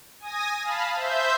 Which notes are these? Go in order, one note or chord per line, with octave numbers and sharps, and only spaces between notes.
G#5 D#6 A#6
F5 A5 B5
C5 E5 G6